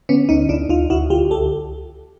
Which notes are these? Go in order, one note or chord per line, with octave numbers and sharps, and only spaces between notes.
D3 B3 C#4
D2 C#4 D#4
D2 D4 E4
D2 D#4 F4
D2 E4 F#4
D3 F4 G4
C#2 G4 A4